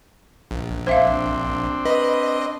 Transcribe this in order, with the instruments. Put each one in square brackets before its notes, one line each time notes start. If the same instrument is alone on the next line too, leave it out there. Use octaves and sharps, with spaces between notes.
[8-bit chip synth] A#1
[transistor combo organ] C4 D4 [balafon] C5 E5 F5
[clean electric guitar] B4 [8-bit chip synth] D#5